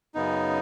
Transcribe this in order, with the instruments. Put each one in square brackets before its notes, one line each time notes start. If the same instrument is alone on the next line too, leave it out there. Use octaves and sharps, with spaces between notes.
[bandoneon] F#2 C#3 B3 D#4